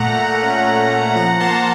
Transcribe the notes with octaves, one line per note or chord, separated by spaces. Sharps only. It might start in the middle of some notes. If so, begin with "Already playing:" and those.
Already playing: A#2 A3 F#5 A#5
A#2
C#4
C#4
A#2
F3 F#5 A#5
A#3 A5 C6